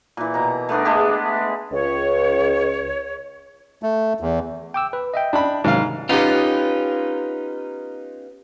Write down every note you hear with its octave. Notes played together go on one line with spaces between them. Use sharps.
A#2 E3
B2 A#5
A3 B3 D4 A#4
G#3 A3 G4 G#4
C#2 C#5
A3
E2
G5 D6 E6
B4
D#5 E5 G5
D4 B5
G#2 C3 D#3 F#3 F5
B3 C#4 D#4 F4 G4